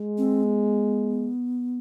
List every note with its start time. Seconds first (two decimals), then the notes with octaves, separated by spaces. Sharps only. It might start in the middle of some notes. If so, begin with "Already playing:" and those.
Already playing: G#3
0.18 C4
0.43 B3